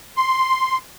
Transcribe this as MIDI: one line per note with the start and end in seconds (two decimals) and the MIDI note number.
0.17 0.77 84